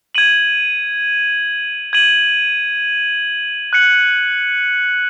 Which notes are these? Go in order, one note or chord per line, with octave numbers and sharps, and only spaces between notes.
G#6 D#7 F#7
G#6 D#7 F#7
F#6 C#7 F#7